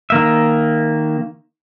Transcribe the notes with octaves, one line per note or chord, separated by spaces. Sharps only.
D#3 A#3 E5